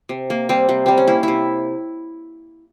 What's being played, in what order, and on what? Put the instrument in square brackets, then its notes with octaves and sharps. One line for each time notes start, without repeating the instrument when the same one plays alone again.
[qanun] C3
A#3
G3 C4
C3
G3 C4
C#4
A#3 E4
C3 E4